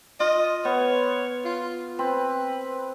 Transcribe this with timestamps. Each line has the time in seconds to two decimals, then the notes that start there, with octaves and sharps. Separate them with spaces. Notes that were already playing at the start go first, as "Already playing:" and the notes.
0.20 F4 D#5
0.65 B3 C#5
1.45 F4
1.99 C4 B4